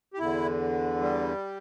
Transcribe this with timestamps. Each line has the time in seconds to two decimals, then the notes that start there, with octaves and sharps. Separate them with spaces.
0.14 G4
0.19 E2 D3 E4
1.01 G3